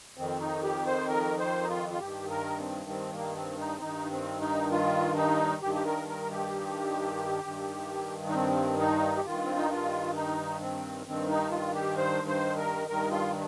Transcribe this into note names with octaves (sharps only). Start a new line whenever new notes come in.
F2 D#3 C4
D#4
G4
C5
A#4
C5
D#4
F4
F4
G2 D#3 G4
A#4
C4
C4
A#3
C4
D#4
C4
G2 D#3 D#4
C4
D#4
F4
D#4
G2 D#3 G4
G4
A#4
A#4
G4
G2 D#3
D#4
C4
D#4
G4
G2 D#3 F4
C4
D#4
F4
D#4
C4
G2 D#3 C4
D#4
F4
G4
C5
C5
A#4
G2 D#3 A#4
F4